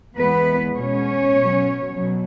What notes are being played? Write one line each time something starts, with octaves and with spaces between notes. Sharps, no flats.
E2 E3 G#3 B3 B4
B2 G#3 C#4 C#5
B2 F#3
B2 F#3